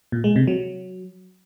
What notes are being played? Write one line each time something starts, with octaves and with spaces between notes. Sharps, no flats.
A#2
G#3
C3
F#3